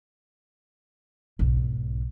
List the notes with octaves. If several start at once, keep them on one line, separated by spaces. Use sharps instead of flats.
B1 G#2